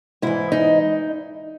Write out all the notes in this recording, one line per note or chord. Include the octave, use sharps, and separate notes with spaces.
G#2 E3 E4
D#4